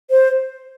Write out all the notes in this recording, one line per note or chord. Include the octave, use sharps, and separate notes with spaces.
C5